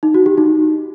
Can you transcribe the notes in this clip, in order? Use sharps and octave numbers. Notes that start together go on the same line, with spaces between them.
D#4
F#4
G4
D#4